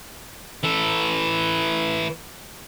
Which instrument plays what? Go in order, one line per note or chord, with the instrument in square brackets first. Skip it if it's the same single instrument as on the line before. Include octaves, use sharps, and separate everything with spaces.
[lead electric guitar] E3 A4